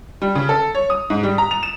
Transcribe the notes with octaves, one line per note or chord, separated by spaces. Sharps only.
G3
C#3
A4
C#5
D#6
G#2
G3
A#5
F7
E7